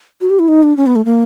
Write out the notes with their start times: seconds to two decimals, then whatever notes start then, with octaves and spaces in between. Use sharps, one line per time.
0.21 F#4
0.30 G4
0.39 E4
0.48 D#4
0.63 D4
0.77 C#4
0.86 B3
0.96 A3
1.05 A#3